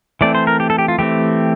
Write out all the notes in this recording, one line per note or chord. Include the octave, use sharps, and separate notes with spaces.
E3 A3 C4 D5
C5
A#4
G4
A4
G4
F4
E3 A3 C4 G4